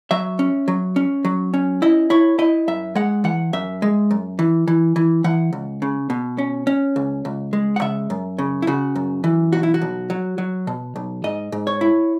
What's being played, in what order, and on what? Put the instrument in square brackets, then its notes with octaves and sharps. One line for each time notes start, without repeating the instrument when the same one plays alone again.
[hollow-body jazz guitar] F#3 E5
C#4
F#3
C#4
F#3
C#4
E4 D#5
E4 C#5
E4 D#5
F#2 E5
G#3 F#5
E3 F#5
F#2 E5
G#3
F#2
E3
E3
E3
E3 F#5
C#2
C#3
B2
C#4
C#4
C#2
C#2
G#3
F#5
C#3 E5
F#2
C#3
E4
C#3 F#4
F#2
E3
B1 F#4
E4
F#4
B1
F#3
F#3
B2
B1
G#2 D#5
G#2
C#5
E4